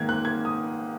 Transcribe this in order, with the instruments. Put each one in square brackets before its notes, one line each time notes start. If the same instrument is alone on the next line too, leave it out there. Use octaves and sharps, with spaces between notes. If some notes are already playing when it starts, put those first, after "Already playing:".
Already playing: [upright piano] G#2 D#3 A#3 G#6
F#6
G#6
D#6